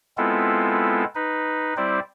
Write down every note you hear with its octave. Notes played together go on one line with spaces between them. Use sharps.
G#3 B3 C4 E4 F4 A4
D#4 B4
G3 C4 E4 C5 D5